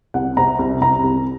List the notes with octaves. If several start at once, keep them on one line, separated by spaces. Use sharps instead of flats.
C2 F#5
C3 A#5
C2
C2 A#5
C2